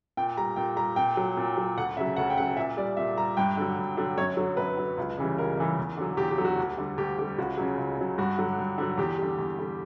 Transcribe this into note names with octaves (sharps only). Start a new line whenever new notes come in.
A#2 G5
G3 A#5
A#2 G5
G3 A#5
A#2 G5
F#3
A#2
F#3
D2 F#5
C#3 F#3 E5
D2 F#5
G5
C#3 F#3 F#5
A#2 E5
G3 D5
A#2 E5
G3 A#5
G2 G5
D3 F#3
G2
D3 F#3
F#2 C#5
D3 F#3
F#2 B4
D3 F#3
C#2
C#3 E3 G3
C#2 A#4
C#3 E3 G3
E2
D3 F#3
E2 G4
G4
D3 F#3
F#4
D2
D3 G3
D2 G4
D3 G3 G4
C#2 F#4
C#3 F#3
C#2
C#3 F#3
G2 F#4
D3 F#3
G2
D3 F#3
E2 G4
D3 G3
E2
D3 G3